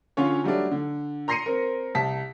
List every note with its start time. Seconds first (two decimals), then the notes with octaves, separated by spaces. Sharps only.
0.17 D3 C#4 F4 C#5
0.44 F#3 G3 A3 D4
0.71 D3
1.28 A#5 C6 A#6 C7 C#7 D#7
1.46 C4 A#4
1.95 C2 A5 B6